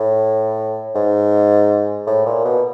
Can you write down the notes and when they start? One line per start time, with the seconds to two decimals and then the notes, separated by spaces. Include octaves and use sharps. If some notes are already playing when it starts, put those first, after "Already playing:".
Already playing: A2
0.95 G#2
2.07 A2
2.26 A#2
2.45 B2